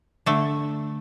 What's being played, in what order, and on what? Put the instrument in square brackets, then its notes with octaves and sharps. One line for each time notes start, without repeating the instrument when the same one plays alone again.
[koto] D3 A3